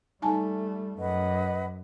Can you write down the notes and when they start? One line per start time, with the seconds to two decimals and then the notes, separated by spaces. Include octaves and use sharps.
0.22 G3 A3 D#4 G#5 A5
0.99 F#2 B4 D#5 F#5